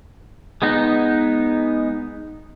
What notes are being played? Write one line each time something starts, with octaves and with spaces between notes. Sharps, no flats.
G#3 B3 D#4